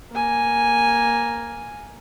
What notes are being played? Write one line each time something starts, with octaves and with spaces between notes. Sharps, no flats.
A#3 G#5